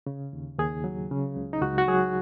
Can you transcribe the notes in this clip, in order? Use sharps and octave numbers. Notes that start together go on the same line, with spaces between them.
C#3
D#2
D#2 G#4
F#3
C#3
C#2
D#4
C#2 F#4
F#4
F#3 G#4